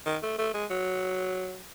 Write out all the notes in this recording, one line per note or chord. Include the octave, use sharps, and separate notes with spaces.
D#3
A3
A3
G#3
F#3